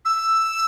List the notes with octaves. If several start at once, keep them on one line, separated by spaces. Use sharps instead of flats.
E6